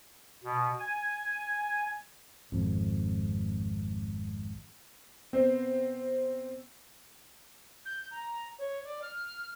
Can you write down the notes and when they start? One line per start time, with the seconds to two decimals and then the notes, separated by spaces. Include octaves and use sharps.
0.44 B2
0.80 G#5
2.52 G#1 F2
5.33 B3 C4 C5
7.85 G6
8.11 A#5
8.58 C#5
8.83 D5
9.02 F6